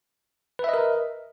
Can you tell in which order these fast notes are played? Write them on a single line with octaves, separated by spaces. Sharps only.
B4 E5 D#5 A#4